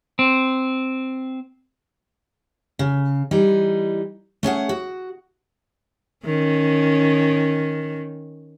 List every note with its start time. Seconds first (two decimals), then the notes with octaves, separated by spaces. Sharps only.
0.19 C4
2.79 C#3
3.31 E3 G3 D#4
4.43 A3 C#4 G#4 F#5
4.69 F#4
6.25 D#3 C#4